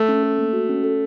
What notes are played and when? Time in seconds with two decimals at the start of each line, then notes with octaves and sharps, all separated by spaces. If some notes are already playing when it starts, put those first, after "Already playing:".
Already playing: A3
0.09 C#4
0.23 A4
0.38 A#3
0.53 F#4
0.69 C#4
0.84 A4